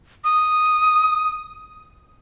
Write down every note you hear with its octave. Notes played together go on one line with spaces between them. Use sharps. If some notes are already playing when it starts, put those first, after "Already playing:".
D#6